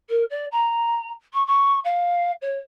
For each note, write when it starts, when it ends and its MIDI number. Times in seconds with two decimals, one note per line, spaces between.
0.09 0.23 70
0.30 0.45 74
0.51 1.10 82
1.33 1.45 85
1.46 1.79 85
1.84 2.31 77
2.41 2.58 73